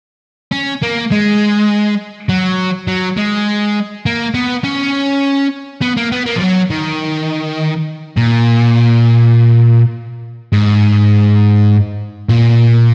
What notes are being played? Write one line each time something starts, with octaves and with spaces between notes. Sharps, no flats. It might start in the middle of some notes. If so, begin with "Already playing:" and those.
C#4
A#3
G#3
F#3
F#3
G#3
A#3
B3
C#4
B3
A#3
B3
A#3
F3
F#3
D#3
A#2
G#2
A#2